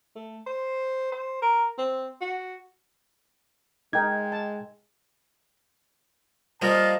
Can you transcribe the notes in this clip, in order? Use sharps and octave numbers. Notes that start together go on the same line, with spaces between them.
A3
C5
C5
A#4
C4
F#4
G#3 D#4 A#4 G5 G#6
A5
F3 G3 A#3 D#5 F5 A5